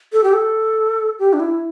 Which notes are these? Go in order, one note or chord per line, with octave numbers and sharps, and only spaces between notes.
A4
G4
A4
G4
D4
E4